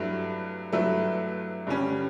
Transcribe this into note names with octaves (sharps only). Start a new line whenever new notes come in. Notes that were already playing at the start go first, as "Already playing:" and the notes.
Already playing: G2 F#3 A3 E4 B4
G2 F#3 A3 E4 B4
G2 D3 G3 C#4